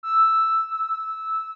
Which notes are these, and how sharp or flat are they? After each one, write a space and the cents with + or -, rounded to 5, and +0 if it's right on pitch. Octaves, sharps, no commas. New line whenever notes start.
E6 +0
E6 -10